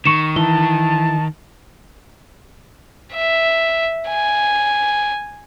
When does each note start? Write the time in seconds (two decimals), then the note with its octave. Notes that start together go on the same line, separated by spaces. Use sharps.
0.05 D#3 C#6 C#7 E7
0.36 E3 A5 G7
3.14 E5
4.09 G#5